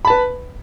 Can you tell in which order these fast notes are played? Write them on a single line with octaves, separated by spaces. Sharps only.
B5 A5 B4